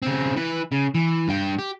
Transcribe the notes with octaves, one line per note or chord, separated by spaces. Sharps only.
C#3 C4
E3 B4
C#3
E3
G2 G5
G4